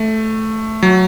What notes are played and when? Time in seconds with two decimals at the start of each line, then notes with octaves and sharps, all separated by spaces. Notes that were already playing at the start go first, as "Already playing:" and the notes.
Already playing: A3
0.83 F#3